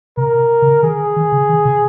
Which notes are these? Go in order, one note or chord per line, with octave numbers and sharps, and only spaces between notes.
C3 A#4
C#3
D#3 G#4
D#3
C#3
D#3
C3